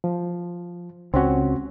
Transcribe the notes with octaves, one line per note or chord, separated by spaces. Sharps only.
F3
C#2 C4 C#4 F#4